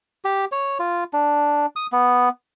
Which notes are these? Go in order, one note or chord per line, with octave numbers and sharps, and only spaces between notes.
G4
C#5
F4
D4
D#6
B3